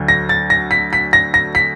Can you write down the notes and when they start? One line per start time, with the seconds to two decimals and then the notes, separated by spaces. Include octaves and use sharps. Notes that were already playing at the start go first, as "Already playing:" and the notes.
Already playing: D2 D3 F#3
0.08 A#6
0.29 A6
0.50 A#6
0.71 B6
0.93 B6
1.13 A#6
1.34 A#6
1.55 B6